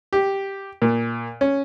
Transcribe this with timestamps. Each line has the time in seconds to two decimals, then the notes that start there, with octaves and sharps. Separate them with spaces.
0.13 G4
0.82 A#2
1.41 C#4